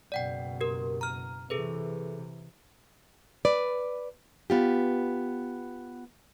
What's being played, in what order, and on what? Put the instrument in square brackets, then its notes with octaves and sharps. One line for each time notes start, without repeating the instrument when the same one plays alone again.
[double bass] F#1 B2 [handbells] D5 F#5 G5
[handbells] G4 A#4
A#5 F6
[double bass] C3 E3 [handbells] G#4 A4 B4
[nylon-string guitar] B4 D5
B3 F4 G4